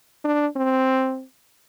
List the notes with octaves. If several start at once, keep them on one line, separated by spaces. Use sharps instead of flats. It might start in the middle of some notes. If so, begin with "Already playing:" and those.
D4
C4